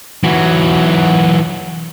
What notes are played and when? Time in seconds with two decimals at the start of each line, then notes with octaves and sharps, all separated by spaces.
0.24 E3 F#3